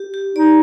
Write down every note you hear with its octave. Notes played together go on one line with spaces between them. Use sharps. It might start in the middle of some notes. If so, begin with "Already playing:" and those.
Already playing: G4
G4
D#4 D5